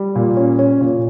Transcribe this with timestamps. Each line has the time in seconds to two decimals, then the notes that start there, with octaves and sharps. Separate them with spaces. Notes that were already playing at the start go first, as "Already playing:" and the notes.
Already playing: G3
0.15 A#2
0.37 C#4
0.59 C#4
0.81 A#2